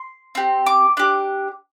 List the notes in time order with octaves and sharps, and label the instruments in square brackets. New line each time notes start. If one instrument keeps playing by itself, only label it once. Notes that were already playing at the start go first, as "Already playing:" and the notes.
Already playing: [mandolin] C6
C4 G4
D6
D4 G4